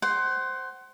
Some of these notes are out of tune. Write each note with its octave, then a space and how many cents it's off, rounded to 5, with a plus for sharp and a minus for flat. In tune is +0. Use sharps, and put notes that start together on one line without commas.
C5 +0 F#5 +25